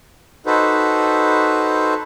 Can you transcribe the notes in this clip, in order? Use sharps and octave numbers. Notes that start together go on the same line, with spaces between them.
D#4 F#4 A4 B4 C5